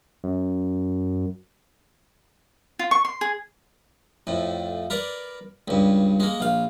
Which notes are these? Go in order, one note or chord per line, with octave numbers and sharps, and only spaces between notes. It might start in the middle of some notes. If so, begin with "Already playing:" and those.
F#2
F4
C#6
C6
G#4
F2 A2
A#4 B4 D5
C#2 G2
G#3 A#3
A#1 F5